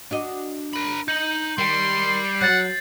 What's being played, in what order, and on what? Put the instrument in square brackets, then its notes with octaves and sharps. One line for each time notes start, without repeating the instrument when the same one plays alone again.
[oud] D4 F#4 D#5
[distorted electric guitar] A#4 B5
[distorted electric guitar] D#4 [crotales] G6 F#7
[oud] D#3 G4 [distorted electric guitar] G3 [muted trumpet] C6
[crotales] C7
[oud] F#3 [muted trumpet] F#5 [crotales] G6 A6